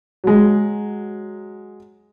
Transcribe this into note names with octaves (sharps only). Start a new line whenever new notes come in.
F#3 G#3